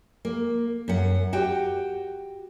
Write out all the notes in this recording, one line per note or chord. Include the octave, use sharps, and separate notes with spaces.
A#3
F#2 F#5
F#4 G4 G5